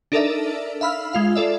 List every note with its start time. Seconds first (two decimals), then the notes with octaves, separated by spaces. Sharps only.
0.12 D4 D#4 A4 A#4 D5 E5
0.81 E5 F5 B5 E6 F6
1.13 G#3 F4 F5
1.36 F4 A4 D5 E5